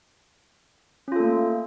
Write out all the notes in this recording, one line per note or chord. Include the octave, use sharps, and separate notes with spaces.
A3 A#3 C#4 F4 A4